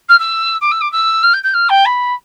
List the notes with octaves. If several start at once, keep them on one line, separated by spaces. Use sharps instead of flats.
F6
E6
D6
E6
D6
E6
F6
G6
G6
F6
G5
B5